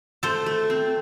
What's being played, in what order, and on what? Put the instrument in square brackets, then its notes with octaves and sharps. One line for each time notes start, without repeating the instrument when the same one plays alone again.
[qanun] A3 [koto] A4 C5
[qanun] A3
C4